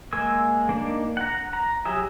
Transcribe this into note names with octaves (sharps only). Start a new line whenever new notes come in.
G#3 A#3 G#5 E6
A#3 D4 D#4
F#5 A#5
A#5
F#3 G4 G#4 E5